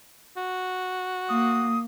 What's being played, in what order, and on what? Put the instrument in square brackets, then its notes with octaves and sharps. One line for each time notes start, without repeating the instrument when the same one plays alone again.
[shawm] F#4
[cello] A#3 [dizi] D#6